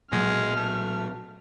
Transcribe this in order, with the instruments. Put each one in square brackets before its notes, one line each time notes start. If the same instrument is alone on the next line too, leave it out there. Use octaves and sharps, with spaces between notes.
[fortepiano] B1 [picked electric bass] A#2 F#3 [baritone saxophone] G#3 [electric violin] F6
[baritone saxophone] A3